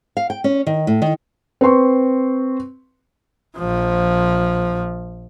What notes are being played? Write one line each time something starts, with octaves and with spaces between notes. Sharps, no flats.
F5
G5
C#4
D#3
A2
D#3
C4 B4 C6 C#6
A#1 F3